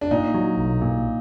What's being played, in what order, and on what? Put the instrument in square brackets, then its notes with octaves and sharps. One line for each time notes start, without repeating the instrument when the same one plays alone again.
[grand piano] D4
[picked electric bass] A#2 [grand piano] D#4
[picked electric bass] F#3
B1
A#2